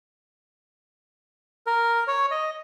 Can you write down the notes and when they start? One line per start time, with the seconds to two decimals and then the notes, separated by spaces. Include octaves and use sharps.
1.67 A#4
2.08 C#5
2.31 D#5